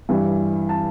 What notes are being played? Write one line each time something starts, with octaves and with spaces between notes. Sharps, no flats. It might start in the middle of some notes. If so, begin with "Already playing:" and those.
G2 E3 G3
A5